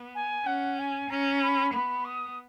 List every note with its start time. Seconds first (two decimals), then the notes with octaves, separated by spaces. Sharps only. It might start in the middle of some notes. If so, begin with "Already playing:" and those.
Already playing: B3
0.14 G#5
0.46 C#4 F#5
0.78 G#5
1.09 C#4 A#5
1.41 B5
1.73 B3 B5
2.04 D#6